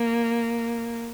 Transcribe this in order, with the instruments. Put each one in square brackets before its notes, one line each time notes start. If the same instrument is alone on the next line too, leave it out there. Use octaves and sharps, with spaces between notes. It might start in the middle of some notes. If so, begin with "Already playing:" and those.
Already playing: [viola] A#3